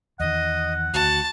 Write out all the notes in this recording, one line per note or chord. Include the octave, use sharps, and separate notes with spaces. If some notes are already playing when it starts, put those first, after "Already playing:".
E2 D#3 D#5 F#5
D2 F#4 A5